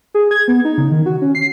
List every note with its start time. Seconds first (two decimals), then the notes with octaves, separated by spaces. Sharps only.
0.15 G#4
0.31 G#6
0.48 B3
0.65 D#4
0.78 C#3
0.91 D#3
1.06 F#4
1.22 C#4
1.35 C7